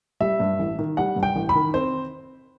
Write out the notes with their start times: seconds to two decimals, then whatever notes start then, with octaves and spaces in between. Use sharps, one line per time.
0.20 G3 E5
0.40 G2
0.59 A1
0.79 D#3
0.97 G3 F#5
1.16 G2
1.23 G5
1.36 A1
1.49 B5
1.55 D#3
1.74 C4 C5